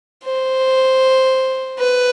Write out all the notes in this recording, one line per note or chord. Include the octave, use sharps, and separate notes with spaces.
C5
B4